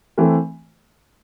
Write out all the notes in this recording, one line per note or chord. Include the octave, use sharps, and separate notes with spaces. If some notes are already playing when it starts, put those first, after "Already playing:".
E3 A3 C4